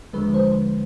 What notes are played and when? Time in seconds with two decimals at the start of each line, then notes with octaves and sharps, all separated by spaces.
0.13 D#2 D3 F3 G#3 B4
0.34 C5